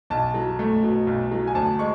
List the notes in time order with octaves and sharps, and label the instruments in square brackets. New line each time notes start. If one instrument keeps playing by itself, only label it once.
[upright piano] B1 A5
F#3
A3
B2
B1
F#3
G#5
D2 A5
G#3 C#6